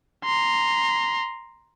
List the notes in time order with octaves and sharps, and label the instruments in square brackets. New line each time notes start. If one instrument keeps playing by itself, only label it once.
[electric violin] A#5 C6